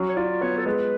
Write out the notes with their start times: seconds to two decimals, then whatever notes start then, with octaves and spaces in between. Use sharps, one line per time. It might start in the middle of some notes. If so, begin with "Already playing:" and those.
Already playing: F#3 C#4
0.09 C#5
0.16 F4 D5
0.41 B3 C#5
0.58 A4
0.66 G#3 B4